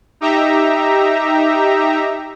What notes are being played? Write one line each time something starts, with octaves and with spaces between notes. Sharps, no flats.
D#4 G4 E5 A#5